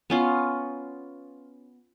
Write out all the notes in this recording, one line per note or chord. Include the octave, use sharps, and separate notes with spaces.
B3 C#4 F4